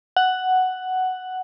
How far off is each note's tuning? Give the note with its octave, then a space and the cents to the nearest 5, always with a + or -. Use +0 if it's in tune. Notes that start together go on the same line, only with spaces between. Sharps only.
F#5 +5